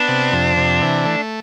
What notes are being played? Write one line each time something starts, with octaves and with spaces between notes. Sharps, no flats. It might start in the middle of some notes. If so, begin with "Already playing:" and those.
Already playing: B3 D4
C3
F2
C3
E3
A3